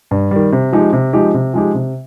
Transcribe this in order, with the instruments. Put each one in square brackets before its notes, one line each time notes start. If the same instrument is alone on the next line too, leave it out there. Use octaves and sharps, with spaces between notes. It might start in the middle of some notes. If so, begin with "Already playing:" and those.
[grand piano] G2
D#3 G3
C3
F3 G#3 D#4 G4
C3
F3 G#3 D#4 G4
C3
F3 G#3 D#4 G4
C3